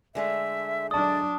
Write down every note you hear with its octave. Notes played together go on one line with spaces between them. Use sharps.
D3 G#3 A3 E5
F#3 D4 D5 A5 D#6